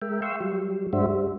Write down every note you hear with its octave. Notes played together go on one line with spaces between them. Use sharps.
G#3 A#4 E5 G5
E5 F5 G5 C6 C#6 E6
F#3 G3
G2 G#3 D4 F#4 C5 E5
G3